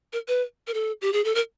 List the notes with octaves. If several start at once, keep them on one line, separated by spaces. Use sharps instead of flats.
A#4
B4
A#4
A4
G4
G#4
A4
A#4